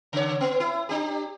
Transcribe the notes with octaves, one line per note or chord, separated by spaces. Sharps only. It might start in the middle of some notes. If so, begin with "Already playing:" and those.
C#3 C#5
B3
E4
D4 G4